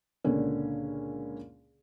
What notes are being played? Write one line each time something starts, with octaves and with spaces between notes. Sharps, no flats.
C#2 A#2 D3 A#3 C#4